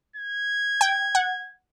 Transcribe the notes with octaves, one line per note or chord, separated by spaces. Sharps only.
G#6
G5
F#5